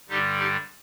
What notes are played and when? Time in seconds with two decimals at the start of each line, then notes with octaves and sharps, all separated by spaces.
0.09 G2 D3 G3 D#4 G4
0.39 D#4 G4